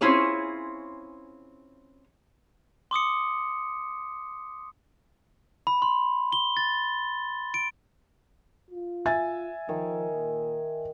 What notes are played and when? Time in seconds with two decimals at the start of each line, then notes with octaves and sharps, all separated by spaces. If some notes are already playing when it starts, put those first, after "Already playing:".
0.01 C4 C#4 E4 F4 G#4 C#5
2.91 C6 D6 D#6 C#7
5.67 B5
5.82 C6
6.32 G7
6.57 A6
7.54 D7
8.71 F4
9.06 E5 G#5 A6
9.69 D#3 F3
10.13 A#2